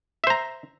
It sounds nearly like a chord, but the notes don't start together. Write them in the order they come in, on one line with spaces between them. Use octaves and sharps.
E5 C5 A#5